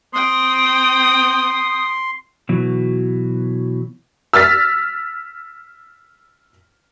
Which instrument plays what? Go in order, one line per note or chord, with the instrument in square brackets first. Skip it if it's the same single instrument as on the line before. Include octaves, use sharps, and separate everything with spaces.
[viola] C4 G5 [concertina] C6 [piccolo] D#6
[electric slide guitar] B2 E3 F#3
[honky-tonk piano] E6 F6 A6 B6